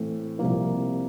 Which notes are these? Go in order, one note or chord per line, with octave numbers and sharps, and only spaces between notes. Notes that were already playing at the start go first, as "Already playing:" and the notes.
Already playing: A2 E3 A3 C4
C2 C3 F3 A#3